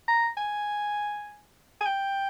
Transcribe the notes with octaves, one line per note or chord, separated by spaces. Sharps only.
A#5
G#5
G#5
G5